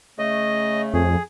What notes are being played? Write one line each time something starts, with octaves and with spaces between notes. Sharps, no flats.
C#3 A3 D#5
F2 G#4